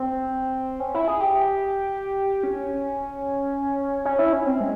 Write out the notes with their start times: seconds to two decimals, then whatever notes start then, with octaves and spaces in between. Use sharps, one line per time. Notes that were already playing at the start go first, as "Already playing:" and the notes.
Already playing: C4
0.80 C#4
0.94 E4
1.08 G#4
1.20 G4
2.44 C#4
4.05 C#4
4.19 E4
4.33 C#4
4.46 C4
4.61 G#3